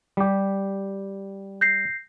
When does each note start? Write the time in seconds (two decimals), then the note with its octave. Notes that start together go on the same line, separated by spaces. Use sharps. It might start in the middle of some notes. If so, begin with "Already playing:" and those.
0.17 G3 G4
1.61 G6 A#6 C7